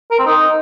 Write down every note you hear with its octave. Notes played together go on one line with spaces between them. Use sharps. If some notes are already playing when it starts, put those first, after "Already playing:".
A#4
C4
D#4